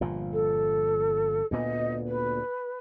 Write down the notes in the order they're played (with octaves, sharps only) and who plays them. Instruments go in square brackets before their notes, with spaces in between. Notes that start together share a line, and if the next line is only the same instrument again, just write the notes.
[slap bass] G1 A#2 F3
[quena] A4
[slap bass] D2 A#2 B3 [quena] D#5
[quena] B4